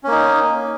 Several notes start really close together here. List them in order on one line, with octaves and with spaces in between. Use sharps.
C#4 A#3 D#4